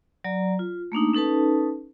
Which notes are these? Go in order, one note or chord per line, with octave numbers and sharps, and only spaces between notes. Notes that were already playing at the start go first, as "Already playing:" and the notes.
F#3 D5 A#5
F4
A3 A#3 D4 D#4
C#4 D#4 A4 B4 A5